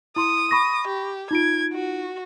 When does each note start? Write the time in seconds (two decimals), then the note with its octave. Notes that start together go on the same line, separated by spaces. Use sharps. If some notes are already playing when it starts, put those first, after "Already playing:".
0.16 E4 C6 D#6
0.51 B5 C#6 A#6
0.87 G4
1.31 D#4 F4 G#6 D7
1.73 F#4